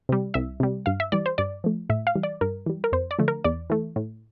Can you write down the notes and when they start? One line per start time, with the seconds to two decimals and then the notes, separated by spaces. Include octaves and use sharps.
0.09 C3 G3
0.34 C2 E5
0.60 C3 G3
0.86 G2 F5
1.00 E5
1.12 E3 G3 D5
1.26 C5
1.38 G2 D5
1.64 F3 A3
1.89 A2 E5
2.07 F5
2.15 E3 G3
2.23 D5
2.41 G2 A#4
2.66 E3 G3
2.84 A#4
2.92 F2 C5
3.11 D5
3.19 D3 F3 A3
3.28 A#4
3.44 E2 D5
3.70 E3 A3
3.96 A2